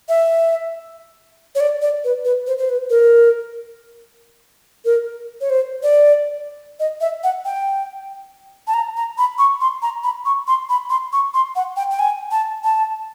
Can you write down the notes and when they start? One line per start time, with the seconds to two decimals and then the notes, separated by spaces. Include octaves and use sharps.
0.09 E5
1.55 C#5
1.60 D5
1.82 D5
2.04 B4
2.25 B4
2.47 C5
2.58 C5
2.69 B4
2.90 A#4
4.85 A#4
5.41 C#5
5.50 C5
5.83 D5
6.80 D#5
7.01 E5
7.23 F#5
7.45 G5
8.67 A5
8.74 A#5
8.96 A#5
9.18 B5
9.38 C#6
9.61 C6
9.82 A#5
10.03 B5
10.25 C#6
10.47 C6
10.69 B5
10.90 C6
11.13 C#6
11.34 C6
11.56 F#5
11.77 G5
11.91 G5
11.99 G#5
12.31 A5
12.64 A5